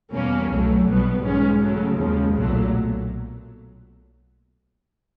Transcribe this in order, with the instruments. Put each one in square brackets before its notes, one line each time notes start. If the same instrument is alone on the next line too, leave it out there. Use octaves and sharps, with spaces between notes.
[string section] E2 B2 G3 A#3 C#4
C2 B2 F#3 A3
B1 B2 G3 B3
G#2 D#3 G#3 C#4
C#3 F#3 A3
D#2 C#3 F3 G#3
B1 A#2 F#3 A3